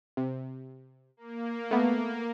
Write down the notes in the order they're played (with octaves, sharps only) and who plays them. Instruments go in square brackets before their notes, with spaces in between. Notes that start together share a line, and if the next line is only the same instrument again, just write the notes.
[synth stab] C3
[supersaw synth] A#3
[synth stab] A3 B3